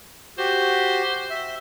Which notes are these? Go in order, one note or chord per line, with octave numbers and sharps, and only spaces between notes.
F#4 G4 C5
E5